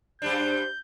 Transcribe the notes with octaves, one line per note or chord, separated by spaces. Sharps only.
F#2 G3 D4 C5 G6